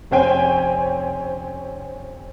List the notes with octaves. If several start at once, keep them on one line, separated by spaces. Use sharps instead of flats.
F1 C4 C#4 C5 G5 G#5